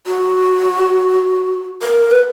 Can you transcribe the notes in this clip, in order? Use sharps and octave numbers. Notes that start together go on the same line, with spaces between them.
F#4
A#4
B4